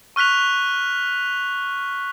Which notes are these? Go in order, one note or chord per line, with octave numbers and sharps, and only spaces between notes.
C#6 F6 F#6 B6 F7